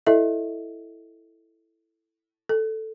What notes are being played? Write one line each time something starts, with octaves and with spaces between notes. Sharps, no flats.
E4 A4 D#5 E5
A4